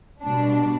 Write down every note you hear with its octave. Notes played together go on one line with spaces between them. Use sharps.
B2 G3 D4